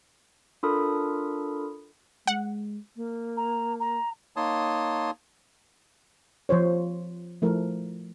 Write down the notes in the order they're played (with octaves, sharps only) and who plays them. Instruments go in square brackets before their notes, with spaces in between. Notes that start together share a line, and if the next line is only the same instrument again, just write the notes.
[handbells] D4 F4 A4 A#4 B5 D#6
[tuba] G#3 [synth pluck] F#5
[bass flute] A#3
[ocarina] A#5
A#5
[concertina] A#3 D#4 C#5 A5 C6 D#6
[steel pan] F3 F4 C5 C#5
F3 A3 E4 A#4